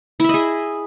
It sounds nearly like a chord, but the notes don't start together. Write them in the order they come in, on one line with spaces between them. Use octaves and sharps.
E4 E5 D#5 G#4